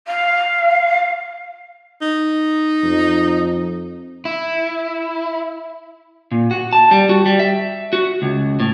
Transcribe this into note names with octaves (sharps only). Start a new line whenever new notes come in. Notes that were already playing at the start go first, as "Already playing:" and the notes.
F5
D#4
F2
E4
A#2
F#4
A5
G3
F#4
G3
E5
F#4
C#2
A2